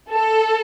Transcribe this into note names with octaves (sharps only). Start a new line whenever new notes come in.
A4